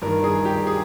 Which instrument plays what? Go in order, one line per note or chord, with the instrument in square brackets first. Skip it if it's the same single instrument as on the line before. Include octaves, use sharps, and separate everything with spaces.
[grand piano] G2 D#3 A#4
G#4
G4
G#4